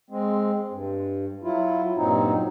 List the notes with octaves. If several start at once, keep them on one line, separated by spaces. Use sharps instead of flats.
G#3 C4
G2
F#3 E4 F4
G2 A#2 F#3 C4 D#4